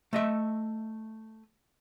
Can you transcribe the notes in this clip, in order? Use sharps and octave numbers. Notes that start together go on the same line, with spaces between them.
A3 D#5 E5